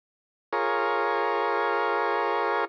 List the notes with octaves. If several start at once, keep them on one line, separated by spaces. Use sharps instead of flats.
F4 G#4 A#4 C#5